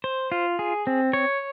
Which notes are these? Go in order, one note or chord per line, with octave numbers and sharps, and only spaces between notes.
C5
F4
G#4
C4
C#5